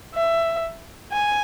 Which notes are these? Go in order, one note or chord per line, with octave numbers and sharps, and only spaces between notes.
E5
G#5